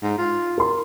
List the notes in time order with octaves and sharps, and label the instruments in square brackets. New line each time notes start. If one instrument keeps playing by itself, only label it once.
[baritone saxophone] G#2
F4
[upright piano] A#4 C6